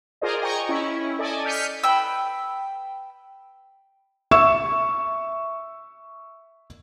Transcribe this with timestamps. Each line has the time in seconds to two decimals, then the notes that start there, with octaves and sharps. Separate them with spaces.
0.21 F4 G#4 A#4 C5 D5 D#5
0.42 D#5 G5 G#5 A#5 C#6
0.69 C#4 E4
1.19 A4 D5 D#5 G#5
1.45 F6 G6 B6 C#7 D#7
1.83 B4 G5 E6
4.31 E5 C#6 E6 E7